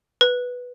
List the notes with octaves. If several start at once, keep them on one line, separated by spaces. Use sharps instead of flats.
B4